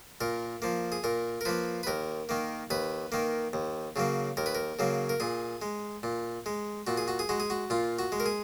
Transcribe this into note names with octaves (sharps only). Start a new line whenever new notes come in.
A#2 A#4
F3 A#3
G#4
A#2 A#4
A#4
F3 A#3 B4
B4
D#2 A#4
D#3 A#3
D#2 B4
D#3 A#3
D#2
C#3 F#3 A#3
D#2 A#4
B4
A#4
C#3 F#3 A#3
A#4
A#2 G#4
G#3
A#2
G#3
A#2 F#4
G#4
F#4
G#4
G#3 F#4
G#4
F#4
A#2 F4
F#4
G#3
A#4
G#4